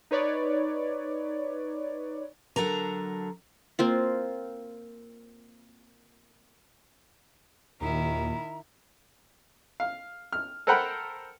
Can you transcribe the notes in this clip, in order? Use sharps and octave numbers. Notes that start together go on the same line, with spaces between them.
D#4 B4 C#5 D5
D3 F#3 A4 A#4 A#5
A#3 C4 F4
D#2 A#2 D#3 E4 A#5
F5
F6
A4 A#4 C5 F#5 G5 B5